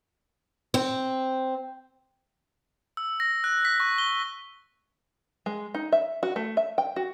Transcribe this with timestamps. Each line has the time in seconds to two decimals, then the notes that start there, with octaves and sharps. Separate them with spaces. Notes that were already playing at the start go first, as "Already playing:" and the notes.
0.74 C4
2.97 E6
3.20 A#6
3.44 F#6
3.65 B6
3.80 C#6
3.98 G7
5.46 G#3
5.74 D#4
5.92 E5
6.23 F#4
6.36 A3
6.57 E5
6.78 G5
6.96 F#4